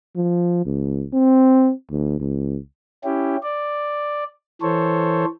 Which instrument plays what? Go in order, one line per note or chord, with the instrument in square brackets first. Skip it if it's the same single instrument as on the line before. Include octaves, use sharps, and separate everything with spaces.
[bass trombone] F3
C#2
C4
D2
C#2
[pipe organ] C#4 E4 G4
D5
E3 A4 C5 C#5